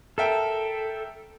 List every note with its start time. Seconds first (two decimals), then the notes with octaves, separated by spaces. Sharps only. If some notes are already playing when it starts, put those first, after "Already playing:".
0.18 A4 A#4 E5 G5